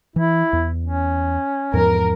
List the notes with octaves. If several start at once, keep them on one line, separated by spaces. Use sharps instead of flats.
E3 E4
E2
C#4
E2 G#2 F3 A#4